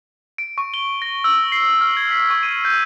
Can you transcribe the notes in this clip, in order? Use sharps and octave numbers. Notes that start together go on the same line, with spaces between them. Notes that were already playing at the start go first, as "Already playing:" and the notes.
D7
C#6
G7
A#6
E6
C7
F6
G#6
B6
C#6
D#7
G6